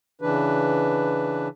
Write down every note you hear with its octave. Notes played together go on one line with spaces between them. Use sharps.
C#3 E3 D4 B4